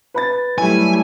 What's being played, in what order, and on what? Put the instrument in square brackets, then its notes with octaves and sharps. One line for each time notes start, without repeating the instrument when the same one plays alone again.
[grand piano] B4 B5 A6
[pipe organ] F#3 [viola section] G3 A3 E4 [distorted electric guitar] G#5